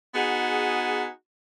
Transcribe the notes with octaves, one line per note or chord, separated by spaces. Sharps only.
B3 D#4 F#4 G#4